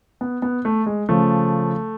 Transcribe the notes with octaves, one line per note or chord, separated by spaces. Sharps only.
B3
B3
A3
G#3
C#3 F3 A3